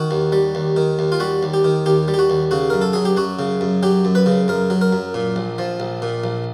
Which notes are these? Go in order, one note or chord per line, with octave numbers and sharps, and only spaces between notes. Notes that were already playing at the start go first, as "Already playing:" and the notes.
Already playing: D#3 F#4
D#2
G3
D#2
D#3
D#2
F4
G3 F#4
D#2
G4
D#3
D#2 G4
G3
G4
F#4
D#2
C#3 F#4
F#2 A#4
A4
F#3 G#4
G4
F#2 F#4
C#3
F#2
F#3 G4
F#2
B4
C#3
F#2 A#4
F#3
A#4
F#2
A#2
A#1
F3
A#1
A#2
A#1